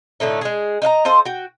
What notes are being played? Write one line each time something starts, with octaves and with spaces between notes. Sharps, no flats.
A2 D3 A3 D#4
G#3 G#4
D#4 D#5 F5 A#5
F4 A4 C5 D#5
F#4 G5